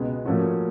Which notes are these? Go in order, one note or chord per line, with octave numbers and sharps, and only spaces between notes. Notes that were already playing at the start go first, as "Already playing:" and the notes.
Already playing: C#2 B2 G#3 B3
A#2 F3 A3 C#4 F#4